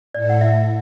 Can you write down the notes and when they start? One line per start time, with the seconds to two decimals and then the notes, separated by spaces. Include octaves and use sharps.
0.14 A2 A3 E4 A4 D5
0.30 F#5
0.41 E5